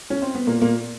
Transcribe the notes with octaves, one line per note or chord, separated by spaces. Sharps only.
C#4
C4
B3
A#2 A#3
A#2 A#3